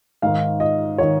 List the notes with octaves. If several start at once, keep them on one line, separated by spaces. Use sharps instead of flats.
G#2 D#3 F5
D#5
D#3 C#5